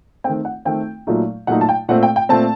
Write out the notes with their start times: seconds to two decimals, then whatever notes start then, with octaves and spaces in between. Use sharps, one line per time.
0.24 D#3 A3 C4 G5
0.45 F#5
0.65 D#3 A3 C4 G5
1.07 A#2 F#3 A3 D#4
1.47 A#2 F#3 A3 D#4 F#5
1.61 A5
1.69 G5
1.89 A#2 A3 C4 F#5
2.03 G5
2.16 G5
2.29 A#2 A3 C4 A5